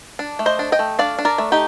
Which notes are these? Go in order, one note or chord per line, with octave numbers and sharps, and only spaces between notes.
D4
A3
C5 D#5
D4
D#5 G5
A3
D4 D5 F5
D4
A#4 D5
A3
D#4 G4